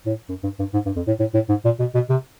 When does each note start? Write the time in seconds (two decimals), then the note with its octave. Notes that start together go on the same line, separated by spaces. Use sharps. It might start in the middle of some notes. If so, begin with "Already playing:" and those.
0.06 A2
0.29 F#2
0.43 G2
0.59 G2
0.74 G#2
0.86 G2
0.96 F2
1.07 A2
1.20 A2
1.34 A2
1.49 G#2
1.65 A#2
1.80 B2
1.95 B2
2.10 C3